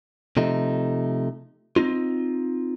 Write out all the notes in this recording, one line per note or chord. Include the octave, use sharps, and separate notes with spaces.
C3 F3 A3 D#4
C4 C#4 D#4 F4